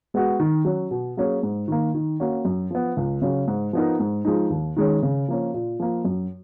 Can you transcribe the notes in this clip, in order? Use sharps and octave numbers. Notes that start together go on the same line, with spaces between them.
G#3 B3 F#4
D#3
F#3 C#4
B2
F#3 A#3 C#4 G#4
G#2
D#3 A#3
D#3
A#3 C#4 F#4
F#2
F3 B3
C#2
C#3 F#3 C#4
G#2
F3 B3 D#4 A#4
G#2
F3 G#3 D#4
D#2
D#3 G#3 C#4
C#3
F3 A#3 C#4
A#2
F3 A#3
F#2